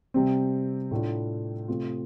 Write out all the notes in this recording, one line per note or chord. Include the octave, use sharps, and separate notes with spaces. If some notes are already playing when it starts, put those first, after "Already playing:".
C3 G3 C4
A2 A3 D4 F4
C3 A3 C4 F4